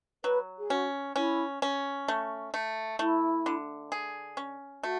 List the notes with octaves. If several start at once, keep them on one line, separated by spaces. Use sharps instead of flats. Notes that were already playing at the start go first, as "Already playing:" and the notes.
F#3 B4
G#4
C#4 F#4
C#4 E4
C#4
A3
A3
A3 E4
D3
G#4
C#4
A3 F#4